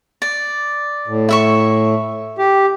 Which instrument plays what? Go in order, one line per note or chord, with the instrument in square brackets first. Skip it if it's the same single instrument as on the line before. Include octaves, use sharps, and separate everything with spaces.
[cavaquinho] D5
[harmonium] A2
[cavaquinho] E4 E5 C#6
[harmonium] G4